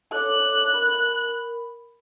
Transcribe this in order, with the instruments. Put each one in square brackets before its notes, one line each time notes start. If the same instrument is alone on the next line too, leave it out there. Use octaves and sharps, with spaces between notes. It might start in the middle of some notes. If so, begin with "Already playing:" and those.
[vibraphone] A4 C#5 D6 [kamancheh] F#6
[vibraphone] A#4 B5